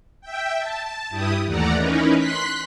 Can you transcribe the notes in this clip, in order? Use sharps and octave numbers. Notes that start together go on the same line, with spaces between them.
E5 G5
A5
G2 E4 G4 D#6
D#2 E3 A3 D5 F#5 A#5
E3 C#4 D#4 A#4 B4
C6 F#6 B6